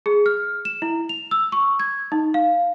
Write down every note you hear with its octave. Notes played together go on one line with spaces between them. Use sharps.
G#4
F6
E7
E4
F7
E6
C#6
G#6
D#4
F5